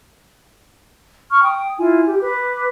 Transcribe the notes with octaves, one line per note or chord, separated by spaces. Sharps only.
C#6 F6
G5 D#6
E4 F4 G#5
G4
B4 D6